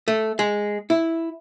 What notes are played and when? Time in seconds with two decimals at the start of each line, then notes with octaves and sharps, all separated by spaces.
0.08 A3
0.39 G#3
0.90 E4